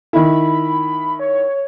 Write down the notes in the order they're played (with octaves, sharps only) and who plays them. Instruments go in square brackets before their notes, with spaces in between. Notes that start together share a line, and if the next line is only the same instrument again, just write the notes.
[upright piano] D#3 E4 [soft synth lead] B5
[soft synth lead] C#5